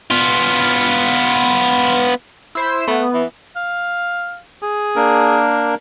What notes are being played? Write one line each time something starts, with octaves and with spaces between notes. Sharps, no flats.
B3 F4
E4 C5 E6
A3 B3
E3
F5
G#4
A#3 D4 A#4